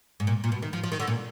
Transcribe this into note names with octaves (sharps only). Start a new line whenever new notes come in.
G#2
A#2
A#2
B2
D#3
F3
F3
D#3
D3
A#2